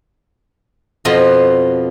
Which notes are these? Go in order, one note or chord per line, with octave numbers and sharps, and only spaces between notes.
F2 B2 F3 D#5